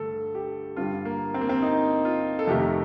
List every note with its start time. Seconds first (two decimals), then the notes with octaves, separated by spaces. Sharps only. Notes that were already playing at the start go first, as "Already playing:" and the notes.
Already playing: G2 D3 A3 A4
0.35 G4
0.77 G2 D3 G3 F4
1.05 A#3
1.34 C4
1.41 A#3
1.49 C4
1.62 D#4
2.05 F4
2.39 A4
2.47 F2 C3 D#3 A3 G4